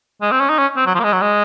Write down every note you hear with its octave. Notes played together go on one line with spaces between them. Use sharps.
G#3
C4
C#4
D#4
C#4
C4
F#3
F3
A#3
G#3
F#3
G#3